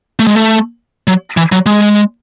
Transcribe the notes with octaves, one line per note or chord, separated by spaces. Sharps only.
A3
G#3
A3
F#3
E3
F#3
G#3